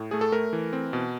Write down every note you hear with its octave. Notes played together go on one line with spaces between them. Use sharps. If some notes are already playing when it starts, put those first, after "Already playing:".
Already playing: A2
A3 G#4
A4
A3 A#4
E3
C4
B2